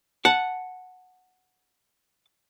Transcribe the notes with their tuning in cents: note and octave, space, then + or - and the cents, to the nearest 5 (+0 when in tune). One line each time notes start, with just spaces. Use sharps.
F#5 -5 A5 +0